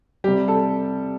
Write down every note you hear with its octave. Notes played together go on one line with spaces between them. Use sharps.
C3 G3 G4
A4